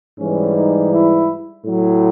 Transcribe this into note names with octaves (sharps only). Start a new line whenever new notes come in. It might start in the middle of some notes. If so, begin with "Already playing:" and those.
G#2 E3 G3 C#4
D#4
E4
A2 F#3